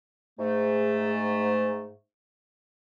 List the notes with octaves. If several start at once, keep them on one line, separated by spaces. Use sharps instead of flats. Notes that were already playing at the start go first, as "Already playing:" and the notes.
G#2 A3